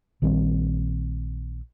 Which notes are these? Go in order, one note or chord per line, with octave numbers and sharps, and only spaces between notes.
A#1 D#3 G3 C4